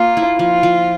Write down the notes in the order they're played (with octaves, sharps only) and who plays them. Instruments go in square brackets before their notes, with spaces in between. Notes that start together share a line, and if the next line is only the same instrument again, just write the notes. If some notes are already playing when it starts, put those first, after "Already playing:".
Already playing: [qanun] A#3 [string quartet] F4
[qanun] E4
[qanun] F3 [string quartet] F4
[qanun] F3